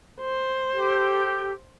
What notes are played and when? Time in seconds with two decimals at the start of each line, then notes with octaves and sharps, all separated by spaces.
0.21 C5
0.73 G4 A4